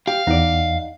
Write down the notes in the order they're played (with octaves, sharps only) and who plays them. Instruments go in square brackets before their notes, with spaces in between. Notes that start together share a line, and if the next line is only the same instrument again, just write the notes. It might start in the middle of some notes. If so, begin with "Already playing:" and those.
[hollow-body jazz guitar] G4 [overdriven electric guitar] F5
[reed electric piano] E2 F#5 [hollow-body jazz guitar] D#4 D5